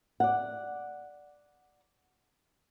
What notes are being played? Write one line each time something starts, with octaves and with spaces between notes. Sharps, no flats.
D5 F#5